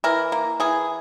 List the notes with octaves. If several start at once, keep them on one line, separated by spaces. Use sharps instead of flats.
E3 A#4
A#3
E3 G#4